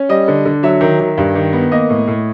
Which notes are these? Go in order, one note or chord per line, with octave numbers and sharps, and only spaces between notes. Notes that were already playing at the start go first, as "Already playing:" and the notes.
Already playing: C#4
G3 D#5
D3
D3
F#3 E5
D#3
D#3
G2
D#3
B3
A#3 D#5
A2
A2